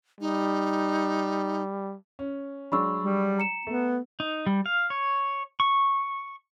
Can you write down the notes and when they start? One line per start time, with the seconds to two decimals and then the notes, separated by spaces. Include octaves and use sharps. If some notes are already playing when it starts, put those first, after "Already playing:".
0.21 G3 D#4
2.19 C#4
2.72 F#3 G#3 D4 B5 C#6 E6
3.03 G3
3.38 A#5 C#7 E7
3.67 A3 B3
4.20 D#4
4.46 G3
4.66 F5
4.90 C#5
5.60 C#6